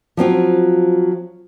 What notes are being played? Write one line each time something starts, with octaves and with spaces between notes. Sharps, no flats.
F3 F#3 C4 F4